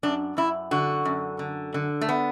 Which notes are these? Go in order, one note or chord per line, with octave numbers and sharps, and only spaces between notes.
F#2 D4
F#2 E4
D3 F#4
F#2
D3
D3
A3
B3